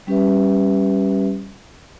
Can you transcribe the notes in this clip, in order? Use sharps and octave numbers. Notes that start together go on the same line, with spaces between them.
G3 C#4 G4 B4 E5